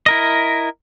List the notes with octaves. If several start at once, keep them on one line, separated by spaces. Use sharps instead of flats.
E4 A#4 D#5